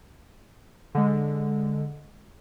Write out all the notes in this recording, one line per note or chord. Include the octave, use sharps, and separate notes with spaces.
D3 G#3